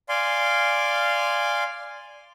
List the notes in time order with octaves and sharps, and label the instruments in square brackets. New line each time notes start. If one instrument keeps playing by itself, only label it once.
[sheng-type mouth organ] D5 F5 G#5 C6